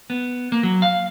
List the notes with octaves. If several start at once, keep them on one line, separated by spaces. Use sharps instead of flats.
B3
A#3
F#3
F5